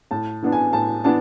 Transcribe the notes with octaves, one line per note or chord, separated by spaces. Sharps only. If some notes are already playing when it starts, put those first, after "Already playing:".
A2 A5
E3 B3 D4
G#5
A2 A5
E3 B3 D4 A5